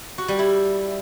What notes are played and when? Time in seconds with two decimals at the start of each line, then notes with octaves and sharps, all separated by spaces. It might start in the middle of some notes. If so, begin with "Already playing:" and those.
0.18 F#4
0.28 G3
0.39 E4